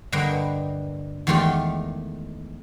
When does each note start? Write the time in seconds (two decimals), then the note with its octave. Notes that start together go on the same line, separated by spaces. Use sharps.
0.12 G2 D3 A#3 B4 D#5 G5
1.27 E2 D#3 G#3 A3 F4 G4